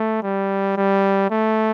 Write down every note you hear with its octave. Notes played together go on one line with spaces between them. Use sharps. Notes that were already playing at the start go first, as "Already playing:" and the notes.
Already playing: A3
G3
G3
A3